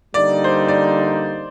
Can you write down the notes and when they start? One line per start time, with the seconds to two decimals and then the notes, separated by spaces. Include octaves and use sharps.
0.14 D3 G3 A#3 D#4 D5
0.44 C5
0.68 D5